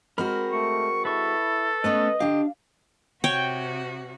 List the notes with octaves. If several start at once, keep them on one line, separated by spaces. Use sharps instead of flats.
G#3 C4 F#4 A#4 B5 F6
A3 C#6
E4 A4 B4 C#6
A3 B3 C#4 B4 D#5
D3 D4 G4 F5
C3 F#4 C#5 G5